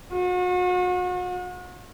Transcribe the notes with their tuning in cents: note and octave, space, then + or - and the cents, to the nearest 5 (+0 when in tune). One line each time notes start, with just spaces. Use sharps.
F#4 -40